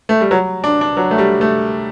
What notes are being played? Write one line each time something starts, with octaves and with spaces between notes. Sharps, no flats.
A3
G3
F#3
D4
D4
F#3
A3
G3
A3